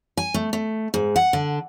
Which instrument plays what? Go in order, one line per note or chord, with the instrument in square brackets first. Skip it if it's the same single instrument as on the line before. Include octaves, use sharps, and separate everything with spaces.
[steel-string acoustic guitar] G#5
A3
A3
G#2
F#5
D3